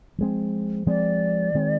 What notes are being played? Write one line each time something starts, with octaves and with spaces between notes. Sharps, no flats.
F3 G#3 C4
F3 G#3 C4 D5
D#3 G#3 C4